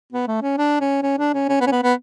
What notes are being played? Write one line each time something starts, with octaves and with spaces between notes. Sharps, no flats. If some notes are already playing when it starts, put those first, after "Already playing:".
B3
A3
C#4
D4
C#4
C#4
D4
C#4
C#4
B3
C#4
B3
B3